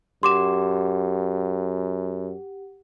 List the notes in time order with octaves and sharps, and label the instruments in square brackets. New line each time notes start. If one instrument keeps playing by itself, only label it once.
[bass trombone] F#2 [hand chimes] G4 F#5 [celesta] C6 D6 E7